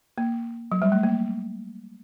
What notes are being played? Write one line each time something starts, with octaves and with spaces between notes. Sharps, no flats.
A#3
F#3
G3
A3
A#3